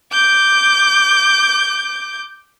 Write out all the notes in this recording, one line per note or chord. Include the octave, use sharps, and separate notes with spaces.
D6 G6